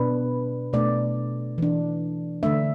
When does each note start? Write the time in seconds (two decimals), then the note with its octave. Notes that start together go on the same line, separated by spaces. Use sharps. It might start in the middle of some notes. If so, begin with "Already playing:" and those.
Already playing: B2 B3 D4 B4
0.73 B2 A3 D4 D5
1.58 E3 D4
2.43 D3 A3 D4 E5